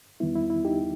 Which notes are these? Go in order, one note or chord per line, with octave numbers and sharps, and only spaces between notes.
E2 D#3 G3 B3 E4
E4
E4
D#4 G4